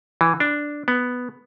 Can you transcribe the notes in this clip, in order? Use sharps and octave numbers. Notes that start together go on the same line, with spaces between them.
E3
D4
B3